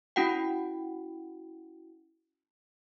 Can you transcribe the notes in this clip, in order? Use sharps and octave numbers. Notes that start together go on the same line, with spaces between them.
C#4 E4 F#4 F#5 G5